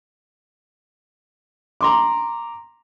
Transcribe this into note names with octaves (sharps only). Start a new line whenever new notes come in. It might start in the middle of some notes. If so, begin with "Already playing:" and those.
A#5 C6 D6